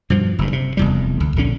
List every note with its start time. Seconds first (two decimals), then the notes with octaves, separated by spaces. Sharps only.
0.10 G2 B2 F3
0.39 F#1 G2
0.53 C3
0.77 F1 E2 G3
1.20 D2
1.36 A#1 D3 C#4